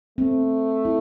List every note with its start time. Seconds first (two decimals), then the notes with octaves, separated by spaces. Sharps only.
0.18 A3 C4
0.85 E4